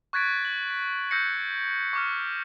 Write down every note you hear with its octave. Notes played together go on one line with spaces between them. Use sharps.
C#6 F#6 G#6 A6 B6 D7
F#7
B6
E6 F#6 G6 A#6 C7 C#7
C#6 D6 F6